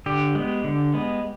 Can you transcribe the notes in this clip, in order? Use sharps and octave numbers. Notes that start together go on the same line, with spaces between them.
D3 G4
G#3 B3
D3
G#3 B3